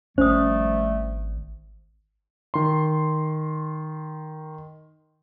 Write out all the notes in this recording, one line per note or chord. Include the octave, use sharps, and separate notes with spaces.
G#1 F3 G3 A3 C#4 C5 D#6
D#3 C6